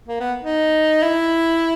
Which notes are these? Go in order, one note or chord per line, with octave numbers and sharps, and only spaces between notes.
A#3
B3
D#4
E4